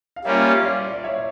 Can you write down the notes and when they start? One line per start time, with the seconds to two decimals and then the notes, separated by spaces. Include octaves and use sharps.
0.16 F5
0.24 G3 A#3 C#4 F4 C#5 E5
0.64 D5 F5
0.94 D5
1.04 C#5 E5